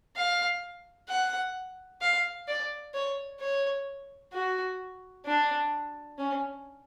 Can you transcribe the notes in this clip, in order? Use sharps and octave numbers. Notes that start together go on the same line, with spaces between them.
F5
F#5
F5
D5
C#5
C#5
F#4
D4
C#4